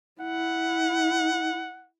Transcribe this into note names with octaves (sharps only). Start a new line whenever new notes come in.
E4 F#5